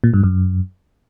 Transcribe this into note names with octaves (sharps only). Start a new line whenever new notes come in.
A#2
G2
F#2